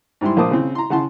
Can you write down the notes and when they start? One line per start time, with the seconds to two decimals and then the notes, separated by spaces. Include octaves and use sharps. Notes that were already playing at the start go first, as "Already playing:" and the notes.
0.21 G#2 G3 E4 C6
0.37 A#1 A#3 C5 A5 D6 D#6
0.51 C#3 C4
0.75 A#5 C6
0.90 C#3 F#5 A5 C6